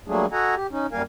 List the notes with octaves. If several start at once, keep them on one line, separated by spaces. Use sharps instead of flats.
F#3 G3 A3 A#3 D4 G#4
F#4 A4 D#5 F#5 G#5 A#5
G4
C#4 D#4
F#2 G3 A#3 A#4 F5 G#5